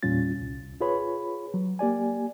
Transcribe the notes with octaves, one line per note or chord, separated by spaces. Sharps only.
E2 A#2 G3 C#4 F4 A6
C2
F4 G#4 B4 C#5 B5
F#3
A#3 G4 D5 G#5